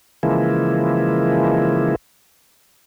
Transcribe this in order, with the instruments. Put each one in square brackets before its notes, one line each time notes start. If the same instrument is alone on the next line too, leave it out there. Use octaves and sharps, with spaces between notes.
[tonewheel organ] C#3 E3 F3 G#3 A#3 E4